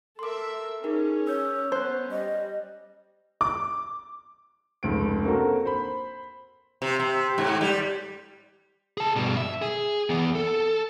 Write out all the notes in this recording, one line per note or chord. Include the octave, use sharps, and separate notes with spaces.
A4 A#4 E5 C6 D6
C#4 D#4 G#4 A#4
C#5 E6 G6
B3 C#4 C5 F#6 G6
G3 D#5
D6
F1 C#2 D7
A#3 C4 D4 F#4 A4 A#4
C5 B5
C3
C3
G#2
G3
G#4 A5
G2 B2
E5
G#4
E2 B3
A4